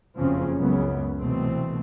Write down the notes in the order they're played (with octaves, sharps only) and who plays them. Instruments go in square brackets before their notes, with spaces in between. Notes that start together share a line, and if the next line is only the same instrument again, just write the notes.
[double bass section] F#1 F2 C#3 F3 C4 C#4
C#2 F#2 C#3 B3
C2 B2 E3 A3 C4